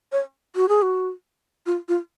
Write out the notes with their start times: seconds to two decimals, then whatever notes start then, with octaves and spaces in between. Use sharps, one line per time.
0.12 C#5
0.56 F#4
0.69 G#4
0.82 F#4
1.66 F4
1.89 F4